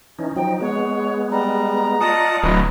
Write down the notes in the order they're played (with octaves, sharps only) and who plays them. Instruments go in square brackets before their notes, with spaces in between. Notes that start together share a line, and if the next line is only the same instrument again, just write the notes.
[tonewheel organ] E3 C#4 D#4
[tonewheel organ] F3 F#3 D#4 [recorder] G5
[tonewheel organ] G#3 B3 [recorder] C#5
[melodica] G3 [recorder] A#5
[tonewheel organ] F4 D5 F#5 [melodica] D#5 A5 D#6
[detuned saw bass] D1 [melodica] B4 C#5 D#5